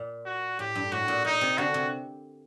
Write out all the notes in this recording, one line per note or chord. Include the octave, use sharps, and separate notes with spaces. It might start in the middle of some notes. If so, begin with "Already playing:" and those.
Already playing: A#2
F#4
A2 G4
G2
A2 F#4
A#2
A#2 D#4
C3
D3 F#4
C3